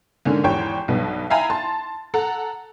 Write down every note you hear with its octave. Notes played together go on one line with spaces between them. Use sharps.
G#2 D3 A#3 C#4
G#1 E2 G4 C5 C#5 G5
B1 G2 B2 B3
E5 F5 G5 G#5 A#5 B5
A5 C6 A6
A4 F#5 A#5